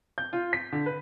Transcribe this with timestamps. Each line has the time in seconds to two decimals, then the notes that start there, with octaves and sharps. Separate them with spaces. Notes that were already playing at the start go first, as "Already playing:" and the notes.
0.18 G6
0.33 F4
0.53 B6
0.73 D3
0.86 B4